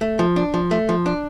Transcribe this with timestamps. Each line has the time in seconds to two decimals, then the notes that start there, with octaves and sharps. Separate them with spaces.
0.01 A3
0.19 F3
0.36 D4
0.54 F3
0.71 A3
0.89 F3
1.06 D4